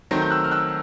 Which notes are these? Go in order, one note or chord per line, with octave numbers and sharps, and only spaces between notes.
D#3 F#3 A3 C4
G6
E6 F#6
F6
E6 F#6